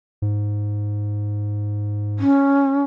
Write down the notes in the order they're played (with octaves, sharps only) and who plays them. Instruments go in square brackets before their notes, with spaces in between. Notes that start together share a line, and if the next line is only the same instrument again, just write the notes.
[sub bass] G#2
[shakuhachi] C#4